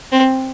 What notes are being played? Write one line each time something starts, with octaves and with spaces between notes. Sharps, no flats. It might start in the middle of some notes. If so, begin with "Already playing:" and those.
C4